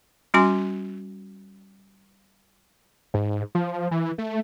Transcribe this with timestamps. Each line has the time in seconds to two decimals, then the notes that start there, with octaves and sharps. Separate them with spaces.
0.34 G3 C#4 F#4 G#5 C6
3.14 G#2
3.55 F3
3.91 E3
4.18 A3